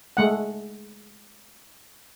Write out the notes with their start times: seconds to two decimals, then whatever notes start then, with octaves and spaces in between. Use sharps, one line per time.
0.17 G#3 A3 F#5